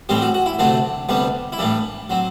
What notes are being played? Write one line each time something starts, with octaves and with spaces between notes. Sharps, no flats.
A2 E3 G3 C4 G4
F#4
F#4
E4
D2 C3 F#3 A3 C4 D4
D2 C3 G3 B3 D4
E4
A2 E3 G3 D4
F#3 C4